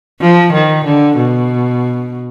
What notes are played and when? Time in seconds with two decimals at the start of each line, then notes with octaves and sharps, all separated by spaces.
0.21 F3
0.53 D#3
0.85 D3
1.17 B2